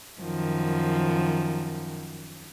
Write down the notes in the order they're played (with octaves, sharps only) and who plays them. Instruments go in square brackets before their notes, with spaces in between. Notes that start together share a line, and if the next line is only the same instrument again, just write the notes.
[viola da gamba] F#2 D#3 F3